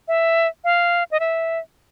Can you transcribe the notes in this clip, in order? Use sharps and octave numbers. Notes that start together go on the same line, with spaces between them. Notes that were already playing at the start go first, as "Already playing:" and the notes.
E5
F5
D#5
E5